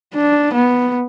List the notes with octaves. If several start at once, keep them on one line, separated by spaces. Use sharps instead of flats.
D4
B3